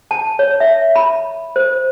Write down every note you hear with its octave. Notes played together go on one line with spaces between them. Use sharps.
A5
C#5
E5
B5
C5